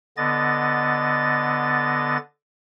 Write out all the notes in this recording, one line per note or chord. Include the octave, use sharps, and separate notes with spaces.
D3 B3 D#5 A6